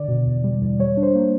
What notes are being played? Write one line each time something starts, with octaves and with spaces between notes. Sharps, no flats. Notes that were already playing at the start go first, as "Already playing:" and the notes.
Already playing: D3 D5
B2
E2
G3
E2
G3 C#5
D4
C5
A#3